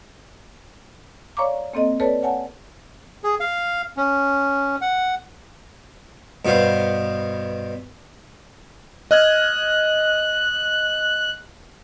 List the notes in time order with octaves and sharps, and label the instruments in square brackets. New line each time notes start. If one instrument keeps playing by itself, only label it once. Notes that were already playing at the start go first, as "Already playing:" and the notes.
[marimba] C#5 D5 F5 A#5 C#6 D6
A#3 C4 A4 D#5
A4 B4 C#5 D5 A5
C#5 F#5 G#5 A5
[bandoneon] G#4
F5
C#4
F#5
[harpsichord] G2 B2 B3 C5 F5
[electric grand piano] D#5 F6 G#6 [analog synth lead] F#6